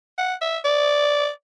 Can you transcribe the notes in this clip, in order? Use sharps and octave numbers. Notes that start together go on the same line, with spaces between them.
F#5
E5
D5